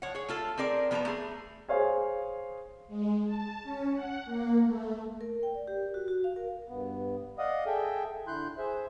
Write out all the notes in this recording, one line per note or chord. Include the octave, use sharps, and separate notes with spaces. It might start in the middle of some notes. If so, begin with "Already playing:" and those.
F3 C#5 F#5
G#4 C#5
A3 F4 A4
C4 G#4 A#4 D5
F3 B3 G#4 B4 A5 A#5
A3 G#4
G#4 C5 C#5 F5 G#5
G#3
A5
C#4
F#5
A#3
A3
A#4
G5
D5
G4
A#4
F#4
F#4
F5
A#4
G2 B3
D5 D#5 F5 F#5 D#6
G#4 A4 E5 G5
D3 E4 C6 F#6 G6
G#4 C5 E5